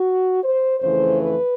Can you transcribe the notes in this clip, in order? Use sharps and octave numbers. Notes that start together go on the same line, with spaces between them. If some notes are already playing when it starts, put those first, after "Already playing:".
Already playing: F#4
C5
F2 C#3 E3 A3 C5
B4